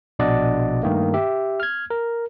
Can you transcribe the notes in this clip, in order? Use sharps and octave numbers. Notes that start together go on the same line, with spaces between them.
A#1 B2 D4 D5 D#5 F#5
G2 D#3 A3 A#3
G4 E5
F6 G#6
A#4